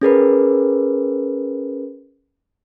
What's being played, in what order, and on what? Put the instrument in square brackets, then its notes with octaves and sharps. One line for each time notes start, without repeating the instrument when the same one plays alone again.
[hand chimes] C#4 G#4 A#4 B4